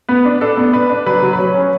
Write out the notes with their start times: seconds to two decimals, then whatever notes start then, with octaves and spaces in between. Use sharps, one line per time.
0.09 B3 B4
0.25 D4
0.41 D4 A4
0.57 B3
0.73 D4 B4
0.90 D4
1.06 F#3 B4
1.22 F#3
1.33 B4
1.38 F#3 C#5
1.54 C#4